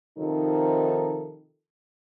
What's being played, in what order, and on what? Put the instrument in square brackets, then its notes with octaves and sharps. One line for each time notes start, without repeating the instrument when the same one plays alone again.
[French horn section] C3 D#3 F3 D#4 A4